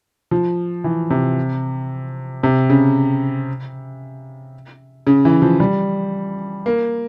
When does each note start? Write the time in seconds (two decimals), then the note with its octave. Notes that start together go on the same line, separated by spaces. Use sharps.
0.31 F3
0.84 E3
1.10 C3
2.43 C3
2.70 C#3
5.07 C#3
5.25 E3
5.42 F3
5.60 G3
6.66 A#3